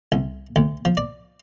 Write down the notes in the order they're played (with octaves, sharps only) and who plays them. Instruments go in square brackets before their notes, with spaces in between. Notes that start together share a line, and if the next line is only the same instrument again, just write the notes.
[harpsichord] C2
D2
F3
D5